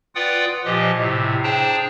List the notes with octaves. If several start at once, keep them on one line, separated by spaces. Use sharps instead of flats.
F4 B4 D5 F#5 G5 D#6
A#2 F3 G4 D#5
A2 C3
D4 G#4 C5 G5 A5 A#5